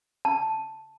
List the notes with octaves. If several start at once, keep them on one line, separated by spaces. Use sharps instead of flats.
A5